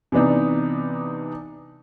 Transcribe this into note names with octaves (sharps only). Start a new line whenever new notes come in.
C3 E3 B3 D4 D#4